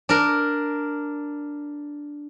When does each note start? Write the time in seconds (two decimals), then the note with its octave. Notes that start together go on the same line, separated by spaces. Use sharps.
0.09 D4 A#4